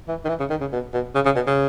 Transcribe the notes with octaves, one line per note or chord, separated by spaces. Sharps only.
E3
D#3
E3
C#3
D#3
C#3
B2
B2
C#3
C#3
B2
C#3